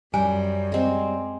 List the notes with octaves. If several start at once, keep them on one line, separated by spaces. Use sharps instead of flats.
F#2 G3 G#5
G#3 C4